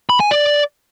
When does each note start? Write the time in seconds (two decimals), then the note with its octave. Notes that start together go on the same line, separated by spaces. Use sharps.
0.10 B5
0.20 G#5
0.31 D5